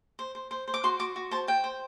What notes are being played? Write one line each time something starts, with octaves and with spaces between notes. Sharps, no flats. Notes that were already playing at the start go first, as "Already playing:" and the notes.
C5
C5
C5
C5
D6
F#4 C6
F#4 D6
F#4
C5 A5
C5 G5
C5